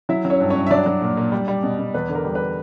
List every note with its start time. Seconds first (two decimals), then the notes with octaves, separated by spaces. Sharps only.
0.09 F#3 E4 E5
0.25 F#3
0.30 C#4 C#5
0.40 G2
0.50 C#4 C#5
0.56 G2
0.67 E5
0.70 F#3 D4 D5
0.86 F#3
1.02 A#2
1.17 A#2
1.32 G3
1.48 G3
1.63 B2
1.79 B2
1.94 E2 B4
2.09 D3
2.15 A#4
2.25 G3
2.35 B4